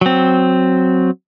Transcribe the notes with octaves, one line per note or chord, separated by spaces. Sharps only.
F#3 C4